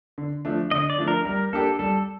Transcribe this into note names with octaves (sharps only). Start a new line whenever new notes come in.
D3
F3 A3 D4
D3 D#5
D5
F3 A3 D4
A#4
G3 A#4
A#3 D4 G4 A4
G3 A4